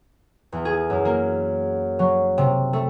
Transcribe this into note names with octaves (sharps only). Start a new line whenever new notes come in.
E2
G#4
F#2
A#3
F#3
C3
A3